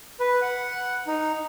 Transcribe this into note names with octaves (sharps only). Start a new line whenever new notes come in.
B4
F#5
D#4